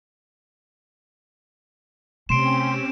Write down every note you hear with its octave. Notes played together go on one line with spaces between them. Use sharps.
C3 A3 C4 C#4 G4 C6 D7 E7